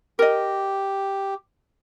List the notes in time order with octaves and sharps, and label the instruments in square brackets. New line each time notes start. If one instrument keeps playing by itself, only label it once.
[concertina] G4 [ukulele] A#4 D#5